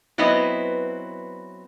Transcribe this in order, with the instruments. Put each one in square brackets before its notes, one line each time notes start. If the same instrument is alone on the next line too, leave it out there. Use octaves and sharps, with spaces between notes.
[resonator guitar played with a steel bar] F#3 B3 C4 E4 B4 D#5